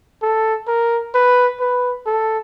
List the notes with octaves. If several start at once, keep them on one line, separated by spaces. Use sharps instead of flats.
A4
A#4
B4
B4
A4